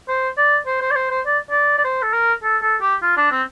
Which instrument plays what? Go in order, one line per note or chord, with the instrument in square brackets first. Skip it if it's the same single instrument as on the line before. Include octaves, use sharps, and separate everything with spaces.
[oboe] C5
D5
C5
C5
D5
C5
C5
D5
D5
D5
C5
A4
A#4
A4
A4
G4
F4
D4
C4